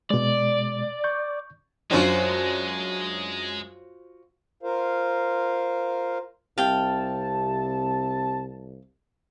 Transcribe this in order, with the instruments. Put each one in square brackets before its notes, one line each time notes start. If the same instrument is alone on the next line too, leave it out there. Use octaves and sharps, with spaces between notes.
[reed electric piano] B2 G#3 [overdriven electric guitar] D5
[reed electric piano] C#6 G6
[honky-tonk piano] F#2 D4 [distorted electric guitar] G#3 [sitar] F4 F#4 C5
[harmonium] F4 A#4 C5 F5
[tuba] C2 [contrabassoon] C3 [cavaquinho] F5 G5 [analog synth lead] A5